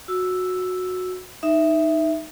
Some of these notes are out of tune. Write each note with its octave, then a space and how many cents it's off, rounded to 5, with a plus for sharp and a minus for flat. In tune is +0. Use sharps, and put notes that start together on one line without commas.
F#4 -15 E6 +0
D#4 +0 E5 +0